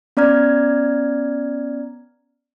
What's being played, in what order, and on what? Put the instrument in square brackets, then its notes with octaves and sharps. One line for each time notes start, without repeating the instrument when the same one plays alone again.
[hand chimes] B3 C#4 D5 A#5 F6 G#6